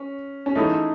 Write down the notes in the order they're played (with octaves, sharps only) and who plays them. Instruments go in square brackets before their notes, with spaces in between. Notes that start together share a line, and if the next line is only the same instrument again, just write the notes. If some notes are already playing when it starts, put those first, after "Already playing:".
Already playing: [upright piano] C#4
C#4
[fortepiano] E3 A3 E4 G#4 [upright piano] D#4